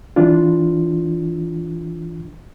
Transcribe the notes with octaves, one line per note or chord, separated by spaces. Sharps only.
E3 D4 F4